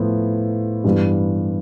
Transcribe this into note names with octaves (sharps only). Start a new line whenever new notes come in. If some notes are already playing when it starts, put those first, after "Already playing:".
Already playing: A2 F3 B3 E4
G2 E3 G3 B3